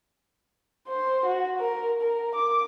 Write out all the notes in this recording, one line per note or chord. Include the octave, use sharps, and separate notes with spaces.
C5
F#4
A#4
A#4
D6